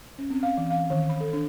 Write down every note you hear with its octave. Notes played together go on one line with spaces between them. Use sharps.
C#4
C4
F5
E3
F5
D#3
B5
A4
D4